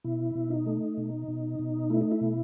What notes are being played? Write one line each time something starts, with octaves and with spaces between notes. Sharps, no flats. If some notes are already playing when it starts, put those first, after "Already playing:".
B2 E4
B2
D#4
A3
B2
B2
B2
A3 E4
D#4
E4
B2